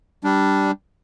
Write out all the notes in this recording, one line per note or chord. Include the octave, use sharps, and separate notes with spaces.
G3 D4